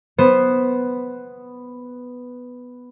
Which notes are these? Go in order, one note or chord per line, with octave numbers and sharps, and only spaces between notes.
B3 C5